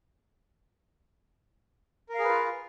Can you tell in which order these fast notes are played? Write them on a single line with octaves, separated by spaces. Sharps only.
A#4 F5 G#4 B4 F4